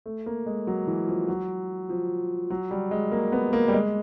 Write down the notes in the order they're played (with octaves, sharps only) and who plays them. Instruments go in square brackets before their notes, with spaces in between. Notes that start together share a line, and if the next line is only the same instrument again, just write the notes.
[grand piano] A3
A#3
G#3
F#3
E3
F3
F#3
F3
F#3
G3
G#3
A#3
B3
A#3
G3
G#3